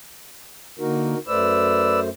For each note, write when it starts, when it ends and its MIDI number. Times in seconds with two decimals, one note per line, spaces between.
0.79 1.15 50
0.79 1.15 58
0.79 1.18 63
0.79 1.18 66
0.79 1.18 70
1.27 2.09 42
1.27 2.09 57
1.27 2.00 71
1.27 2.09 72
1.27 2.00 74
1.27 2.00 88